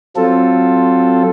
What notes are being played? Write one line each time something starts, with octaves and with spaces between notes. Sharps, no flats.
F#3 C4 F4 A4